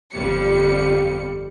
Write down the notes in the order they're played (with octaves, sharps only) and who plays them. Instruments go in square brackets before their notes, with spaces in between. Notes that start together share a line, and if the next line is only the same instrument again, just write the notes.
[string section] G1 F2 G3 C#7